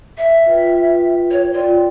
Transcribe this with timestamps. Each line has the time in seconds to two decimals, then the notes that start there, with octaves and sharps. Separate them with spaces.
0.18 E5
0.46 F4 B4 G5
1.31 C#5
1.53 F4 A#4 D5 G5